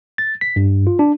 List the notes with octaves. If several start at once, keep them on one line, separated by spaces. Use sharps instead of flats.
A6
B6
G2
F4
D4